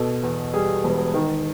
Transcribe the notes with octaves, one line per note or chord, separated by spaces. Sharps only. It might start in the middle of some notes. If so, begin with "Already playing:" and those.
Already playing: B2 A4
E2
G3 G#4
E1
D#3